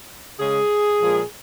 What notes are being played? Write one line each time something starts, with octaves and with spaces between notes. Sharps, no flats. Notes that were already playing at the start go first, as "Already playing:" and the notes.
C#3 G#3 G#4
A#2 F3 G#3